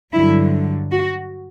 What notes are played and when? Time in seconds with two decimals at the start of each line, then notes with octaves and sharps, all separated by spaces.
0.13 G2 D3 F#3 E4
0.91 F#4